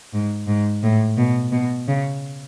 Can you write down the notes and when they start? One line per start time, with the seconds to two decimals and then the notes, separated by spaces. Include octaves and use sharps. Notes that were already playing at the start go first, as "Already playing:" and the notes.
0.13 G#2
0.48 G#2
0.83 A2
1.17 B2
1.52 B2
1.88 C#3